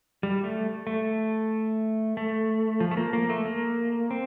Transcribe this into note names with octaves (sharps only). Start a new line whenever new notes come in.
G3
A3
A3
A3
F3
A3
A#3
A#3
A3
A#3
C4